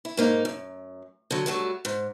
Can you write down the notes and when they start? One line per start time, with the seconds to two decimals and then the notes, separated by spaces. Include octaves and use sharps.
0.05 E4
0.17 G#2 A#3 D#4
0.45 F#2
1.31 D3 F#3
1.46 F#3 G3 A3 F#4
1.85 G#2